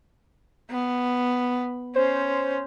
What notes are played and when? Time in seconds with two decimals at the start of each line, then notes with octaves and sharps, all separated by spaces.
0.70 B3
1.96 C#4 C5